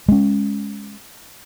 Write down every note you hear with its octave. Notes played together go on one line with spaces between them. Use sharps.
G#3 C#4